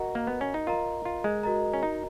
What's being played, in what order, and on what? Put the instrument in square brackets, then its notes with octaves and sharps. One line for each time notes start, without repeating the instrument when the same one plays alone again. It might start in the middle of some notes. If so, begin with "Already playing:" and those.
Already playing: [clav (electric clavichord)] F#4 [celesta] A#4 D#5 F#5 A#5
[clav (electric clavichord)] A#3
B3
C#4
D#4
[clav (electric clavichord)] F4 [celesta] A#4 D#5 A#5
[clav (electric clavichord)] F4
G#3
[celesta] F#4 A#4 D#5 A#5
[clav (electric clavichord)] C#4
D#4